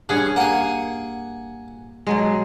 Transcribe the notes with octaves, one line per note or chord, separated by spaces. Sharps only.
G2 C#4 G#4 F#5
A#3 F#5 G#5
B2 F#3 G#3